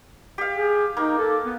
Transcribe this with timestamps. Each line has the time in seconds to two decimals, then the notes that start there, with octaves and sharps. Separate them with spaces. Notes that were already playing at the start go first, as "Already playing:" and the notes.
0.38 G4 F5
0.55 G#4
0.97 A#3 D#4
1.18 A4
1.45 B3